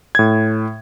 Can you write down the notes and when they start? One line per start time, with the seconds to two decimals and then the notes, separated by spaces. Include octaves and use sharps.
0.15 A2 G#6